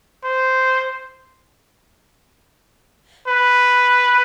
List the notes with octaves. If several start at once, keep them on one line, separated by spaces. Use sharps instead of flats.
C5
B4